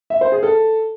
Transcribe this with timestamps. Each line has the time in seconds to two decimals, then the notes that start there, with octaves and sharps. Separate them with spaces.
0.10 E5
0.21 C5
0.32 G#4
0.43 A4